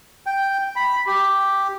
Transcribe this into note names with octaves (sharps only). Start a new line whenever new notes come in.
G5
B5
G4